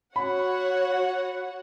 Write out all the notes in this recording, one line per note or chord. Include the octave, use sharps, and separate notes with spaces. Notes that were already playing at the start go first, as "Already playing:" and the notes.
F#4 C#5 F#5 B5